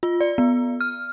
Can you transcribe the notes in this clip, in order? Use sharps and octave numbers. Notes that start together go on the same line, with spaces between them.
F4
D5
B3
F6